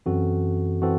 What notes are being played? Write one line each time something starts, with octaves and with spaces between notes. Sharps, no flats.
F#2 E3 C4 F#4 A4
E3 C4 F#4 A4